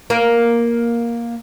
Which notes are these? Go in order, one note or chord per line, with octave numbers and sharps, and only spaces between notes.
A#3 A#4